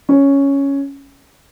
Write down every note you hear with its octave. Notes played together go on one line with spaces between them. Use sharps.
C#4